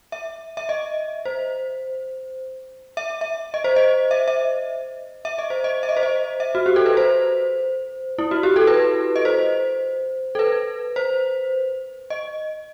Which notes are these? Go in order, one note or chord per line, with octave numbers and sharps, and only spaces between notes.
E5
E5
D#5
C5
E5
E5
D#5
C5
D#5
E5
E5
E5
D#5
C5
D#5
E5
D#5
C5
D#5
E5
F#4
G4
A4
B4
C5
E4
F#4
G4
A4
B4
D#5
C5
A4
B4
C5
D#5